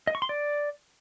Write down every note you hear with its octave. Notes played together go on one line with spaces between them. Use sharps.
D#5
C#6
C6
D5